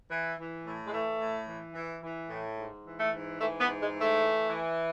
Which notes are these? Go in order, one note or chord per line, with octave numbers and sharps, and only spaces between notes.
E3
E3
A2
G#3
E3 A3
A2
E3
E3
E3
A2
G#2
E3
A3
G#2
E3 A3
B3
G#2
G#3
E3
A3
E3
E3